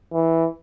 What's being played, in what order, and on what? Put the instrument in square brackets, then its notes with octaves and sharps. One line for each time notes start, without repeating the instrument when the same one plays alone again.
[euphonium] E3